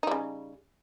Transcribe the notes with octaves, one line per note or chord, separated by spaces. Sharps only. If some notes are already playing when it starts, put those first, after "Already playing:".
C#3 G3 D#4